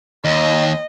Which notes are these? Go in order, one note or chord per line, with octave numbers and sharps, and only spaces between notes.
D#2 D#5